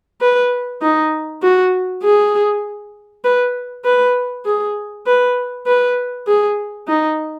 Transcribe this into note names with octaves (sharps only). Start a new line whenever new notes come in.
B4
D#4
F#4
G#4
B4
B4
G#4
B4
B4
G#4
D#4